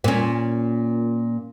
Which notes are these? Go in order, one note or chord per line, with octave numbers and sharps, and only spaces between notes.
A#2 C#4